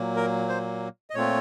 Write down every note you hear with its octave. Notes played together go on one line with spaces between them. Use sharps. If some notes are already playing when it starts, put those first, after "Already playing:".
Already playing: A#2 F#3 A#3
A#4
C5
D#5
A#2 A3 C4 F4 C#5